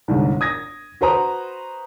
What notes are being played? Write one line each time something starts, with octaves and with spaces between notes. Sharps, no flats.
G1 C2 G#2
D#6 G#6 A#6
F#4 B4 C5 A#5 D#6